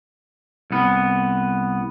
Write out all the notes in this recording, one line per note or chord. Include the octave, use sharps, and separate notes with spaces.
C2 B3